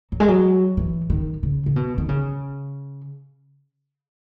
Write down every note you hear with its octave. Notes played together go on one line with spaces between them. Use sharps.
F#3
G#3
F#3
E3
D#3
C#3
C#3
B2
D#3
C#3